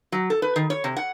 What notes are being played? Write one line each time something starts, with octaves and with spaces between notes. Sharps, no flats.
F#3
A4
B4
D#3
C#5
C3
F#5